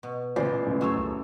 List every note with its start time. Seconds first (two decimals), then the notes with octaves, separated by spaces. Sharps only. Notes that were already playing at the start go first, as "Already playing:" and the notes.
0.03 B2
0.36 C#2 A#2 E3 C5 D5 D#5
0.66 D#1 A1
0.81 F#2 A3 C5 C#5 E6
0.97 C#2